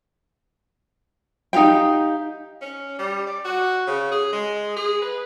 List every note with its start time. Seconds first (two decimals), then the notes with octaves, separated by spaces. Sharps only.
1.53 D#4 G4 F5 G5
2.61 C#4
2.99 G3
3.27 D5
3.45 F#4
3.87 C#3
4.12 G#4
4.33 G#3
4.77 G#4
5.02 B4